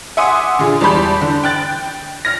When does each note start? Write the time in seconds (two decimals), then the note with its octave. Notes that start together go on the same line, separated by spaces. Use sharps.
0.17 E5 F#5 G#5 C6 D6 D#6
0.59 A#2 D3 G#4
0.81 E2 G3 A5 B5 G6
1.21 D3
1.43 G5 F#6 A6
2.25 F6 A#6